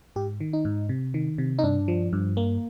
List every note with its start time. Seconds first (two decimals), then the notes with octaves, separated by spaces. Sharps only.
0.16 G#2 G4
0.40 D#3
0.53 D#4
0.65 G#2
0.89 C3
1.14 D#3
1.38 C3
1.59 D#4
1.63 G2 D4
1.88 F3
2.13 G2
2.37 A#3